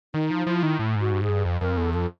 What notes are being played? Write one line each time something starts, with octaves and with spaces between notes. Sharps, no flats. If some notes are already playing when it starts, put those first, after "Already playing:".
D#3 D#4
F3
F3 E4
D#3
A2
G#2
F#4
G2
G#2 G#4
G2
F2
F2 A#4
E2 A4
F2 A4